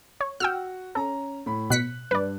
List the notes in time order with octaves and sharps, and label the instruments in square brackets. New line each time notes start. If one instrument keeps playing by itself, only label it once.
[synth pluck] C#5
[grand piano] F#4 [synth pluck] G5 E6 F6
[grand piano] C#4 A#5 [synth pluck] A4
[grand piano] A2 B5
[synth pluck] B2 B6 C#7 [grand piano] F#6
[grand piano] G2 [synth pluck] B4 D5